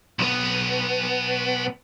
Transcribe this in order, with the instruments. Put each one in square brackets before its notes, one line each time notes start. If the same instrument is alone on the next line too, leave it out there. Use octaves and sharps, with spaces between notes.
[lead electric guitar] B1 B3